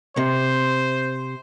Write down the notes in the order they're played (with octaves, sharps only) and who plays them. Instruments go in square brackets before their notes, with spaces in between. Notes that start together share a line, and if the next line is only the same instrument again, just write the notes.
[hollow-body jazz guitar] C3 [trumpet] C5